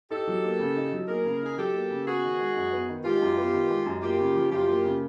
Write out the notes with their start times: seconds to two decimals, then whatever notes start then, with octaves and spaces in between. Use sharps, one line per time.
0.10 D#4 G4 A4
0.28 F#3
0.43 A#3
0.60 C#3
0.76 D#4
0.92 F#3
1.08 A#3 G#4 A#4
1.24 C#3
1.42 D#4 G#4
1.57 F#3 G4 A4
1.73 A#3
1.91 C#3
2.06 B3 F#4 G#4
2.23 D#3
2.39 G#3
2.56 F#2
2.72 B3
2.88 D#3
3.04 G#3 F4 G4
3.21 F#2
3.37 B3
3.53 D#3
3.70 G#3
3.86 F#2
4.02 A#3 F4 G4
4.19 C#3
4.35 F3
4.51 F#2 F4 G4
4.68 A#3
4.84 C#3